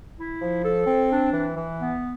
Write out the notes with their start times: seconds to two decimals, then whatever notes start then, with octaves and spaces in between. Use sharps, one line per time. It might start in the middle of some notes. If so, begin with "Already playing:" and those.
0.19 E4
0.41 F3
0.64 A4
0.87 C4
1.11 D4
1.32 E3
1.56 E3
1.79 B3